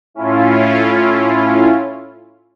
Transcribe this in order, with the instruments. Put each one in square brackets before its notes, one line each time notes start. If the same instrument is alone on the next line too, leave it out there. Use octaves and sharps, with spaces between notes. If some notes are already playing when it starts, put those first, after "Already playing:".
[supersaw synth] A2 C#4 E4 F4